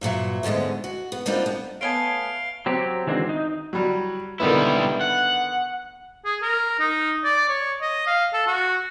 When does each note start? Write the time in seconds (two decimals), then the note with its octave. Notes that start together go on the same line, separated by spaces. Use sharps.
0.01 G2 A#2 F#3 E5
0.43 D2 G#2 D3 G#3 B3
0.84 F#4
1.12 B3
1.26 G3 A#3 C4 D4 D#4 F4
1.46 B3
1.81 A3 B3 C#5 F5 G#5 A5 D7 G7
2.66 F#3 C4 G4
3.07 D#3 E3 G#3 C4 D4 F#4
3.29 D#4
3.73 F#3 G3
4.40 D3 D#3 G3 B3 E4
5.01 F#5
6.25 G#4
6.42 A#4
6.80 D#4
7.24 D5
7.49 C#5
7.81 D#5
8.07 F5
8.33 A4
8.47 F#4